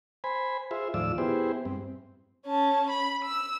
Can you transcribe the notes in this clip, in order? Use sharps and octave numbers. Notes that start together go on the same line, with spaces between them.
C5 G#5 B5
F4 G#4 C5 E5
D#2 A2 F3 F4 D5 E6
B3 E4 G4 G#4 C5
G2 C4
C#4 A5
B5
E6